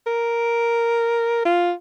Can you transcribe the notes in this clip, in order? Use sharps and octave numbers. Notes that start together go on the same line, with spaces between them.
A#4
F4